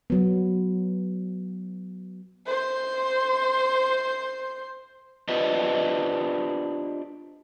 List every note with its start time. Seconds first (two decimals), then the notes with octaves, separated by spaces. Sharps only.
0.10 F#3 B3
2.47 C5 C6
5.28 D4 F4 G4 B4 C5 D#5